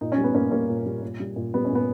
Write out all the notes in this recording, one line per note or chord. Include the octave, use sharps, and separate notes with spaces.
A#2 D#4
C#4
G3
B3
A#2 A#3 C#4
G3 A#3 C#4
A#2
G3
A#2
G3
A#2
G3 B3
C#4
A#2
B3